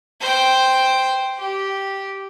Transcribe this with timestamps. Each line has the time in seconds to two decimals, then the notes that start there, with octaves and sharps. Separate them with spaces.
0.20 C5 G5
1.38 G4